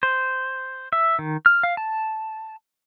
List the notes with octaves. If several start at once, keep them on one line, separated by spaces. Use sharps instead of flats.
C5
E5
D#3
F6
F5
A5